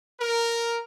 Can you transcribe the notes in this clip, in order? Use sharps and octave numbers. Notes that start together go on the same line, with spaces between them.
A#4